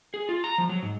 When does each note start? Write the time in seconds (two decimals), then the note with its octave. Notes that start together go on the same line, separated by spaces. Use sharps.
0.14 G#4
0.29 F4
0.44 A#5
0.58 F3
0.69 F#3
0.82 G#2